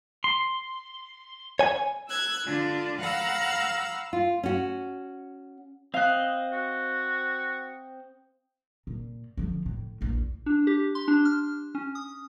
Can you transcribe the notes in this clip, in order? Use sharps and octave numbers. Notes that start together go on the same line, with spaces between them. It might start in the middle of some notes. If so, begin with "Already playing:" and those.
C6
C#5 G#5
E6 F#6 G#6
D3 D4 F4
F5 F#5 A#5 B5 E6
F4
C#4 F#4
C4 D#5 F5 F#6
F#4
A#2
D3 F3
A2
A#1 E2
D4
G4
C6
D4
F6
C#4
D#6